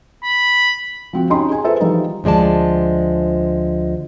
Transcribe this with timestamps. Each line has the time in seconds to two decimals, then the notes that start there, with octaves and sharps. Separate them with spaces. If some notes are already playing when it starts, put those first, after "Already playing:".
0.24 B5
1.13 F3 C4 F#4
1.30 C#4 D#4 G4 B5 C6
1.49 G#4 G#5
1.64 F4 G#4 A4 B4 C5 E5
1.81 E3 F3 G3 D#4
2.24 D2 F3 G#3 D5 A5